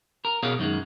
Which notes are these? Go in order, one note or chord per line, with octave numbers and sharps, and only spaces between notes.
A#4
B2 G#4 A#4 C#5 F5
F#2 D#3 G#3